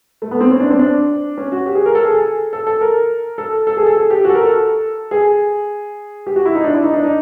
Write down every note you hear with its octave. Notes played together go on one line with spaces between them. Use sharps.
A3
B3
C4
C#4
D4
C4
D4
C#4
F#4
G4
G#4
A#4
A4
G#4
A4
A4
A4
A#4
A4
A4
G#4
A4
G#4
G4
F#4
A4
A#4
A4
G#4
G4
F#4
E4
D#4
D4
E4
D#4
D4
D#4